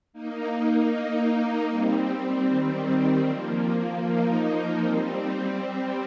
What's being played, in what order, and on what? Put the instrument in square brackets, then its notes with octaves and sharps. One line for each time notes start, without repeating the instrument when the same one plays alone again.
[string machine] A#3 D#4
A#3 D#4
G3 C4
D#3 G3
D#3 G3
F3 A#3
A#3 D#4
G3 C4